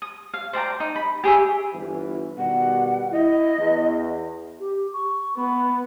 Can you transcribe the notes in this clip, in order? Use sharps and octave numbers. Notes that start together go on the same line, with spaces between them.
D#6
F5
C5 D5 G5 A#5
D#4
B5
G4 G#4 C#5 E5
G1 E3
B2 D#3 G3 F#5
E4 D#5
E2
G4
C#6
B3 B5